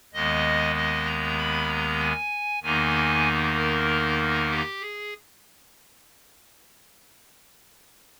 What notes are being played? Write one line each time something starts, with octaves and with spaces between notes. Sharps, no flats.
D#2 D#3 G#3 B3 D#5
D#5
A#5
B5
A#5
G#5
E2 D#3 A#3 D#4 G#5
A#4
G4
G#4